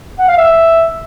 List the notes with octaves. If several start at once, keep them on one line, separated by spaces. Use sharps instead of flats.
F#5
F5
E5